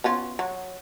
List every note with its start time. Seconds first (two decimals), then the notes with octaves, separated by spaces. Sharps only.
0.04 B3 C#4 F4
0.39 F#3